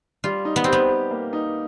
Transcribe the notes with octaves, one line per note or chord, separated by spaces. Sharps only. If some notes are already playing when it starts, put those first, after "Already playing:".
G3 F4
D#4
B3
C4 G4
B3
G4
A#3
D#4